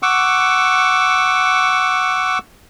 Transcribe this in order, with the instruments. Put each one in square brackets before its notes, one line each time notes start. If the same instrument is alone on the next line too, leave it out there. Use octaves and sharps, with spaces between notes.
[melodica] F#5 C#6 D6 E6